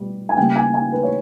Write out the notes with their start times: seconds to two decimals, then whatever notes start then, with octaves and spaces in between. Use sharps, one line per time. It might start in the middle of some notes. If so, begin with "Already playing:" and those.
Already playing: B2 G3 B3
0.29 G#5
0.37 C#3 G3 A#3 G5
0.56 G#5
0.74 G#5
0.92 B4
1.03 C#5